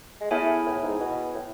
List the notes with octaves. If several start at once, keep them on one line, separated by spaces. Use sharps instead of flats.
G#3
A3 B3 E4 G#4 C#5 G#5
A2
G#2
B2
A2